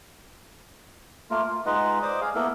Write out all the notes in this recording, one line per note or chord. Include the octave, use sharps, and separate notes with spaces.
A3 A#3 F4 A#4
F4
G#3 D#4 F4 B4 D#5 F#5
C5 D5 D#5 D6 D#6
G#4 F5
A#3 B3 E4 A4 A#4